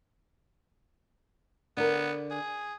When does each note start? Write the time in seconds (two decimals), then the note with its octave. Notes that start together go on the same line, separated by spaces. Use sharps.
1.77 D3 B3 A#4
2.31 G#4